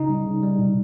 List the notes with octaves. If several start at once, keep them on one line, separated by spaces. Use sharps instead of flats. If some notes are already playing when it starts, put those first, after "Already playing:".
Already playing: C#3 D#4
G3
C#3
G3
B2